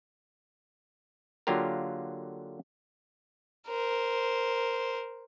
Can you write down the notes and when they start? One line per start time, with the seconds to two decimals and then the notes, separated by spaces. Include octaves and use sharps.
1.47 D3 F#3 A#3 F4 G4 A#4
3.67 A#4 C5